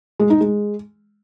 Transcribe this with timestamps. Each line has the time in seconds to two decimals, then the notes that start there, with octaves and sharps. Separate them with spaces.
0.20 G#3
0.30 D#4
0.41 G#3